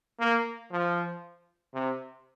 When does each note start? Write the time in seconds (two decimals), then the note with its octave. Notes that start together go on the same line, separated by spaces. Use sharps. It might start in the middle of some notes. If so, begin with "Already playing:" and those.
0.20 A#3
0.71 F3
1.74 C3